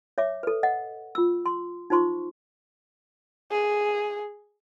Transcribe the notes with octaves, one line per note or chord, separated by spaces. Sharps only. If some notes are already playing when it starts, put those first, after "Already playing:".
C#5 E5 D6
A4 B4
D#5 F#5
F4 E6
C6
D#4 F4 C5 C6 C#6
G#4